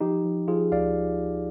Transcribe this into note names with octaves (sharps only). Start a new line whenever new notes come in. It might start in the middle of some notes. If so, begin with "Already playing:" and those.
F3 D#4 G4
F3
F3 F4 G#4
D2 D5 F5